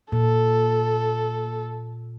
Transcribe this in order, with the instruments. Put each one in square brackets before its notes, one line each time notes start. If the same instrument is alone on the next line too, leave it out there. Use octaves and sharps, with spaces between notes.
[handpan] A#2 [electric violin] A4